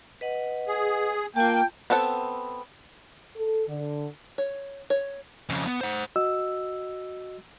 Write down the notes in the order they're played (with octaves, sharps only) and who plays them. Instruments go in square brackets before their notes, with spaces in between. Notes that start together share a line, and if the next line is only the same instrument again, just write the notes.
[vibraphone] B4 D#5 F#5
[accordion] G#4
[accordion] A#3 [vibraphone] F4 A5 [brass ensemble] G5
[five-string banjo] B3 C4 A4 F#5
[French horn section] A4
D3
[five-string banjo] C#5
C#5
[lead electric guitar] F2 C#3
B3
C5 F#5
[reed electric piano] F#4 D#5 E6